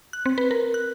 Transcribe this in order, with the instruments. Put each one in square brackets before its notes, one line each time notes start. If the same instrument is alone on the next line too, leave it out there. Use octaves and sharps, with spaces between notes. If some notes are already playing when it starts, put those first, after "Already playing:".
[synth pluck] F#6
C4
B4
A#4
F#6